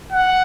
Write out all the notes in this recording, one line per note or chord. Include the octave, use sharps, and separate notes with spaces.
F#5